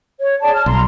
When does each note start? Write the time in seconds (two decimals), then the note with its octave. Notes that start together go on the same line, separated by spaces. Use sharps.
0.19 C#5
0.42 G#4 D5 A5
0.54 A5 F6
0.66 B1 A#5 C6